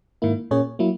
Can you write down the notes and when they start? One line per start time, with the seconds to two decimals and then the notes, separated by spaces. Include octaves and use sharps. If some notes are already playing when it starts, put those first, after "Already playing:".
0.22 G#2 D#3 A#3 E4
0.51 A#2 A#3 C#4 G#4 C#5
0.79 F#3 A#3 E4